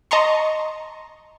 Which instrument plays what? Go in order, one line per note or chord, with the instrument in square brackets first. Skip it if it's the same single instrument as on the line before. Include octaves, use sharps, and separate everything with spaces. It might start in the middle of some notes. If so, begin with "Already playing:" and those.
[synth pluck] D#5 A5 A#5 C6 C#6